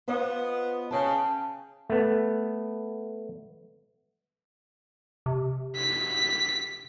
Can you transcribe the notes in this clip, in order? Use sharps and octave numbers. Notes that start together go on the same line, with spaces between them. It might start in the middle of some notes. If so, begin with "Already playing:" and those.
B3 F4 C5 D#5
C#3 G5 A5
A3 B3
C3
B6